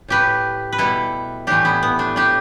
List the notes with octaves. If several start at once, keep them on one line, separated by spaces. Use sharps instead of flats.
A2 A3 G4 B4
B4
B2 G3 E4 A4
A2 E3 A3 D4 G4
B3 E4
B3
A3 D4
A2 A3 D4 G4